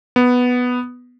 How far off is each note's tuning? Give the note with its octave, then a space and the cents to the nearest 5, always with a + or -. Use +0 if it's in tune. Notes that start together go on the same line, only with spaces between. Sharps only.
B3 +0